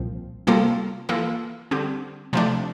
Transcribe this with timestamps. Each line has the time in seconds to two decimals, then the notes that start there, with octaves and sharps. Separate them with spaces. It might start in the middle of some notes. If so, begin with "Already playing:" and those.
Already playing: C2 A#2 F3 C4
0.47 C3 G3 A#3 F4 A4
1.09 E3 A#3 F4 A4
1.71 D3 G3 C4 G4
2.33 C3 F3 A3 D4